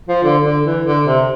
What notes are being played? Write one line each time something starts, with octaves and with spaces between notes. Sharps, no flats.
F3
D3
D3
E3
D3
C3